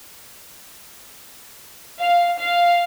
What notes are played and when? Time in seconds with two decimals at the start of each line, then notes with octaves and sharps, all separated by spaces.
1.98 F5
2.39 F5